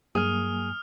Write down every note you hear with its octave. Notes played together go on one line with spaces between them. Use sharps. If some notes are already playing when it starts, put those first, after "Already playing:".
G2 F#3 A#3 G#4 G#5 D#6 F6